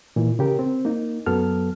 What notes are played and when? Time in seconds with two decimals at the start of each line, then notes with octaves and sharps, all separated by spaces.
0.16 A#2 E3
0.39 C#3 G4 A#4
0.59 C4
0.85 A#3 D#4
1.26 F#2 F#3 B3 A4 F6